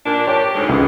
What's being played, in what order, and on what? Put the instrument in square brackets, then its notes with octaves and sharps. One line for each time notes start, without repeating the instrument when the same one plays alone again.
[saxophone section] A#2 D4
[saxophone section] G4 [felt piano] C#5 A5
[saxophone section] D2 G#2 G#3
[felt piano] C#2